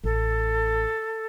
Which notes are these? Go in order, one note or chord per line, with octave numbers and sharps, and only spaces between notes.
A1 A4